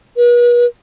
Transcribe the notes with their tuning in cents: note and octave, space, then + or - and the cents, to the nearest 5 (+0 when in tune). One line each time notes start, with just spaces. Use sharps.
B4 -45